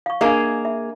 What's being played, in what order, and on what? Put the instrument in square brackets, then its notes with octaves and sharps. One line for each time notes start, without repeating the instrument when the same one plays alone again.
[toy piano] F5 C#6
[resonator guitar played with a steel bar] A#3 G#4 F5 [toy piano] D4 A#4 D#5
[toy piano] E5